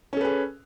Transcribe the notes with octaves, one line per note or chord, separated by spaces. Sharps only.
C#4 G#4 A4 B4